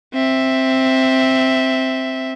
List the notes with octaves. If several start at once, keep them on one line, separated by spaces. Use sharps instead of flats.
C4 E5